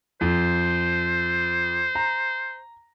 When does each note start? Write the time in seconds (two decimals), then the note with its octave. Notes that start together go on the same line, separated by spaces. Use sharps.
0.21 F2 C5
1.95 A#5